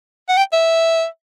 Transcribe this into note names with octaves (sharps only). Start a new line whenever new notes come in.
F#5
G5
E5